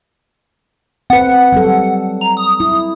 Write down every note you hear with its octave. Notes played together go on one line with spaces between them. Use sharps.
C4 B4 F#5
F#3 G3 A4
A#5
D#6
E4